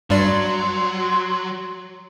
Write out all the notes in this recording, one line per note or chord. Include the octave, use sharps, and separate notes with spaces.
G2 F#3 G3 D5 C6